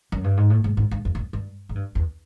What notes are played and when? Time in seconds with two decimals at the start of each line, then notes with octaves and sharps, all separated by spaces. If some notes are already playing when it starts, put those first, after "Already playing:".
0.12 F#2
0.24 G2
0.37 G#2
0.50 A2
0.64 G#2
0.77 G#2
0.91 G2
1.05 F2
1.15 G2
1.19 F#2
1.33 G2
1.69 G#2
1.75 G2
1.95 E2